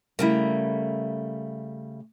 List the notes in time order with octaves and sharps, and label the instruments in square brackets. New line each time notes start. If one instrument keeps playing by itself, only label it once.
[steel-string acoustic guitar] C#3 G3 A3 [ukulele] E4 A#4